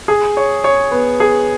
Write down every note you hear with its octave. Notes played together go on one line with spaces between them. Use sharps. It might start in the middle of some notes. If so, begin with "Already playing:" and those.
G#4
C#5
C#5
B3
G#4